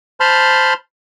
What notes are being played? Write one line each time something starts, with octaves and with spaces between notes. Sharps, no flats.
C5 A5 B5 C6 F6